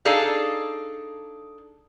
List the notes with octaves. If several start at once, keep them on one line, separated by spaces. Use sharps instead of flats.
D4 D#4 G#4 A4 F5